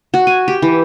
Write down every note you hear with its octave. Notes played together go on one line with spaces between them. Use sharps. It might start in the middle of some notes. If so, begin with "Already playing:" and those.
F#4
G#5
G4
E3